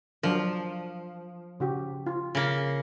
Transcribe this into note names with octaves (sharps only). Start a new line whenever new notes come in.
F3 F#3 D4 A#4
C#3 F#4 G4
F4
C#3 A#3